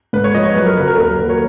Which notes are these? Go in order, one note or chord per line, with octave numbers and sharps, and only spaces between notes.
G#2 B4
C#5
F3 D#5
C#5
F#2 B4
A#4
C#3 F#3 B4
A#4
D#2 A#4
A#4
D#3 F#3 B4
C#5